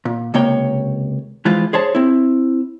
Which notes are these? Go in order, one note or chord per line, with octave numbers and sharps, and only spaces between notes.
A#2
C#2 C3 A#3 C#5 G5
E3 F3 G#3 F4
G#4 C5 C#5 A5
C4 E4